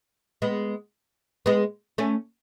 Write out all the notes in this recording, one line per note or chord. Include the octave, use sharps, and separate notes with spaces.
G#3 B3
G#3 B3
A3 C#4